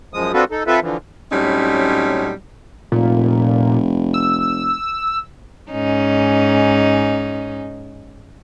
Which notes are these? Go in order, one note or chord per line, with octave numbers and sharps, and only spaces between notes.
F#2 F3 G#3 D#6
C4 D4 F4 F#4 A4 B4
D#4 A4
C4 F4 A4 B4 E5
D3 E3 F3
A2 F#3 G3 C4 C#4 D#4
F1 A#2
E6
G#2 C#4 D#4